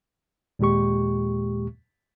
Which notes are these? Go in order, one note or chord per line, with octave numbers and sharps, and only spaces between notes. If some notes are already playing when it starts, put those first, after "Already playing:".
D#2 A#2 G#3 G4 C#6